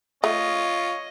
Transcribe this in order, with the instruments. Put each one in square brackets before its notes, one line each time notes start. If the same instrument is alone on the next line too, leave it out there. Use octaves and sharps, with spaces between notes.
[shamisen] A3 [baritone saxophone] F4 [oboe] C#5 [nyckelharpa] D#5